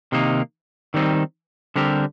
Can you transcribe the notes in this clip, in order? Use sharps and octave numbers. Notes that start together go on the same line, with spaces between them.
C3 D#3 A#3 D#4
D#3 G3 C4 D#4
D3 G3 C4 G4 A#4